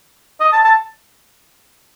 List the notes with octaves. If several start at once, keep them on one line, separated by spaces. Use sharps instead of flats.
D#5
A5
A5